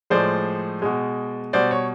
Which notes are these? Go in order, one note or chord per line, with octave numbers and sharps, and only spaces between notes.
A2 F3 G#3 C5 D5
B2 G#3
B2 G3 C5 D5
C#5